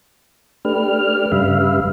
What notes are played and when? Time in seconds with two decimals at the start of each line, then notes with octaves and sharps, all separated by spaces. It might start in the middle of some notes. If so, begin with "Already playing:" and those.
0.65 A3 D4 G4 B4 F6
1.32 G2 C#3 G3 B4 E5 F5